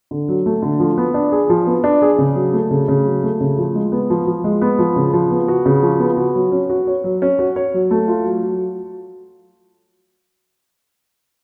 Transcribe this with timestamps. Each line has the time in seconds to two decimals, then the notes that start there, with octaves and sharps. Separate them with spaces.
0.11 D3
0.29 F#3
0.46 A3
0.62 D3
0.80 F3
0.98 B3
1.14 D4
1.32 G#4
1.50 F3
1.67 B3
1.84 D4
2.02 G#4
2.18 C#3
2.36 F#3
2.53 A3
2.71 C#3
2.88 C#3
3.05 F#3
3.23 A3
3.41 C#3
3.58 F3
3.75 G#3
3.92 B3
4.10 F3
4.27 F3
4.44 G#3
4.62 B3
4.79 F3
4.96 C#3
5.13 F3
5.31 B3
5.48 F#4
5.66 C#3
5.83 F3
6.00 B3
6.17 F#4
6.35 F#3
6.52 C#4
6.70 F#4
6.87 C#5
7.04 F#3
7.22 C#4
7.39 F#4
7.56 C#5
7.74 F#3
7.91 A3
8.08 F4
8.25 F#3
8.42 F#3